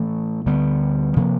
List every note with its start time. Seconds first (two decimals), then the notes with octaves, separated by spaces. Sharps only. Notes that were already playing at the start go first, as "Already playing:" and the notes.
Already playing: A2 E3 A3
0.46 D2 D3 G3 B3
1.16 C3 F3 A#3